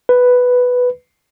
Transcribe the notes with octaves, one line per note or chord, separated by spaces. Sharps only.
B4